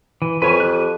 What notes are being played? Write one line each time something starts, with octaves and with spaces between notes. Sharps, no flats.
E3
F2 B4 C#5 G#5
G4 F#6